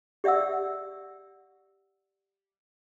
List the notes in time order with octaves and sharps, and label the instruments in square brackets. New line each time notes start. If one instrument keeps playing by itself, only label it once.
[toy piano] G4 D5 E5 F#5 E6